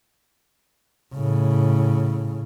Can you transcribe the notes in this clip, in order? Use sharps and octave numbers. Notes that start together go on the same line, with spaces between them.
A2 C#3